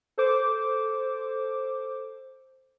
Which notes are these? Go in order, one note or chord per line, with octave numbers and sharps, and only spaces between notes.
A4 C5 D6